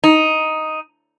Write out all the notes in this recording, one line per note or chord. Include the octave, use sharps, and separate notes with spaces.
D#4